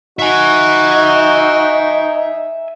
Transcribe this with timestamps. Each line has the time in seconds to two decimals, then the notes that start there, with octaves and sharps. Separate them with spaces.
0.19 D#4 F#4 E5 G#5